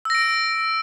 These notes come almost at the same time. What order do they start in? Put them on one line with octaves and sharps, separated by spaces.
E6 A#6 D7